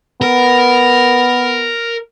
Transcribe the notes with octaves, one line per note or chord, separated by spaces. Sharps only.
B3 A#4